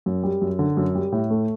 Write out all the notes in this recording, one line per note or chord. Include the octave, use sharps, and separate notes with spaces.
F#2
G3
F#2
D3
F#2
G3
A2
A3